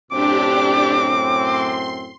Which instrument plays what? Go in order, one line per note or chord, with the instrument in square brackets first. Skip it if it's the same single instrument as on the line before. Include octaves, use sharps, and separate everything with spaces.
[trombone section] F#2 A2 C4 [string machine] D4 G4 [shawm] D6
[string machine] C6